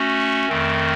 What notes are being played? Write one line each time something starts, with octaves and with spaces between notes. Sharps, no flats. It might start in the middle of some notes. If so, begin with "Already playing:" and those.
Already playing: A3 C#4 F#4
F2 D#3 A3 C4